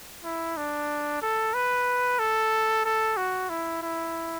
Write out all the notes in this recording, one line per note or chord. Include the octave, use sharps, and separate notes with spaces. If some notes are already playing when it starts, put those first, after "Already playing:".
E4
D4
A4
B4
A4
A4
F#4
E4
E4